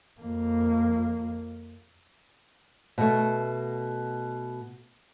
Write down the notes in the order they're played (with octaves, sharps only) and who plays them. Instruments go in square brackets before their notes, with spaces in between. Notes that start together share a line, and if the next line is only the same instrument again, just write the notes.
[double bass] F2 A#3
[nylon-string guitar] B2 A3